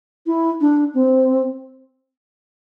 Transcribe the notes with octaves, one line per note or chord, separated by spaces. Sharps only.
E4
D4
C4